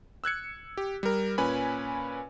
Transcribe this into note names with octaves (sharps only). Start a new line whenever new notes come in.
E6 F#6 G#6 C#7
G4
G3 A#4
A#2 C#4 B4 G#5 B5